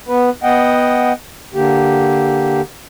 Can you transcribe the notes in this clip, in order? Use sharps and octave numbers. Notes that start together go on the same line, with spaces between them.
B3 B4
B3 D#5 F#5 G5
D3 A#3 G4